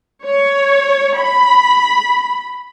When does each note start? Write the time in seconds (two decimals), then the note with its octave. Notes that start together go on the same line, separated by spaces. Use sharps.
0.25 C#5
1.20 B5